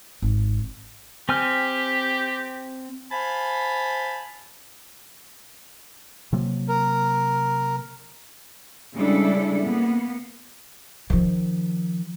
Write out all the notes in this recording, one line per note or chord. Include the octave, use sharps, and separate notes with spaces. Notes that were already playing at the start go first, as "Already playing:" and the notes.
G#1
C4 G4 G#5 F6
C5 F5 G#5 A5 B5
C3 F#3 A#3
A#4
C#3 G3 G#3 D4 E4 A4
A#3 B3
D#3 F3